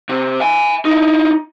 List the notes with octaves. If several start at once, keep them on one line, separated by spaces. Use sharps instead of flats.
C3
E5 G#5
D#4 E4